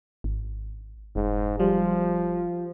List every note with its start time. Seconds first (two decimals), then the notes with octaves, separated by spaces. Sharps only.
0.24 G#1
1.16 F1 G#2
1.60 F3 G3